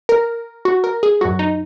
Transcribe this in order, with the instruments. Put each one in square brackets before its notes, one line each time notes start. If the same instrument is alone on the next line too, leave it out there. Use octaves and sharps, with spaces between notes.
[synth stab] A#4
F#4
A#4
G#4
F#2 F#3 F#4
D#4